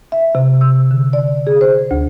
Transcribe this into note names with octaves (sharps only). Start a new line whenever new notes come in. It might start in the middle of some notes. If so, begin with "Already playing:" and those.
E5
C3
E6
D3
D5
G#4
C5
D2